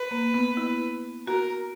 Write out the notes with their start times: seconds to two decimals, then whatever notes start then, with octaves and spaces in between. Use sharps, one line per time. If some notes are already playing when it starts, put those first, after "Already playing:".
Already playing: B4
0.11 A#3
0.34 B3
0.57 E4
1.27 F#4 A#4